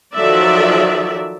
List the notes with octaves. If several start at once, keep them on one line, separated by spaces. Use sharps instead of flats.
D#3 F3 F#3 A4 D5 E5